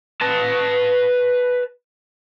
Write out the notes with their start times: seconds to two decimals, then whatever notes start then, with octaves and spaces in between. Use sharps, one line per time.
0.21 B4 A5